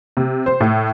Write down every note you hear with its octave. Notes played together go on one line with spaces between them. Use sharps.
C3
C5
A2